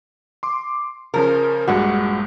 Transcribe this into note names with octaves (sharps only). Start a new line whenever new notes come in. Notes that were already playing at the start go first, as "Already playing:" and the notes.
C6 D6
C#3 F3 C#4 A#4
A#1 G2 G#3 F#4